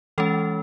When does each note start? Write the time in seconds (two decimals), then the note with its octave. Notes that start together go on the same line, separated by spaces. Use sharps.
0.18 E3 G#3 C#4 A4